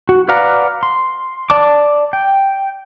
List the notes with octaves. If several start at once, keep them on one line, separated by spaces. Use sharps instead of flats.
F#4
B4 D5 F5 F#5 A#5
C6
D5 A5 D6
G5